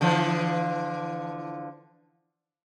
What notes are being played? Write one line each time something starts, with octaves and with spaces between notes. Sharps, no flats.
D3 E3 F3